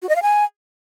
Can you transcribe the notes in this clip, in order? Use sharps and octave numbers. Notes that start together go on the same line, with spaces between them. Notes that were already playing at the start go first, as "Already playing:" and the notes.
F#4
D#5
F5
G#5